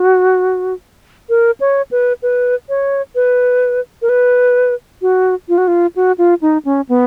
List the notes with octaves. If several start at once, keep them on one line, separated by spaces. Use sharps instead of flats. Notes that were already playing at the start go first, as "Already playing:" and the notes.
Already playing: F#4
A#4
C#5
B4
B4
C#5
B4
A#4
B4
F#4
F4
F#4
F4
F#4
F4
D#4
C#4
B3